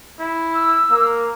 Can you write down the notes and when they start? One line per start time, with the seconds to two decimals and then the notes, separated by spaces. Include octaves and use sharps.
0.20 E4
0.54 E6
0.91 A#3